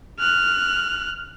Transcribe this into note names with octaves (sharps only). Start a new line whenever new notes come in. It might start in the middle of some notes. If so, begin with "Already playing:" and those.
F6 F#6